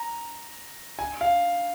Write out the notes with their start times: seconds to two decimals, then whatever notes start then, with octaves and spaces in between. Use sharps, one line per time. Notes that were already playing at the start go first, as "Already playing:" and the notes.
Already playing: A#5
0.99 G#5
1.21 F5